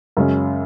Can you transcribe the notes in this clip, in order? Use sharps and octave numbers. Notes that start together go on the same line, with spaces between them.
F#2 C#3 G#3 C#4